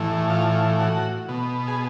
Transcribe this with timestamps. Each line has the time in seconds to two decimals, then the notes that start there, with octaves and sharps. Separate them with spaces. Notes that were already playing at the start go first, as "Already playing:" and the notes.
Already playing: A2 E3
0.30 F4
0.79 F#4
1.29 B2
1.67 G#4